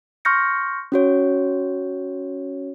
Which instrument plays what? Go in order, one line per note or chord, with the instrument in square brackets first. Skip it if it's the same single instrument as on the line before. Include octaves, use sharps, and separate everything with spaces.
[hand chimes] C6 C#6 F6 G6 A#6 C#7
C#4 F#4 C#5